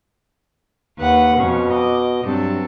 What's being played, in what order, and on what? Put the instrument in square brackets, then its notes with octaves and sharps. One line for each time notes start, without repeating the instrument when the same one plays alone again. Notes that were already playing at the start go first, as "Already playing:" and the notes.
[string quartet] D#2 B4 F#5
[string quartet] F2 C#4 [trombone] B2
[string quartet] D#5 D6
[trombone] G2 [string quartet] F#3 C4 A4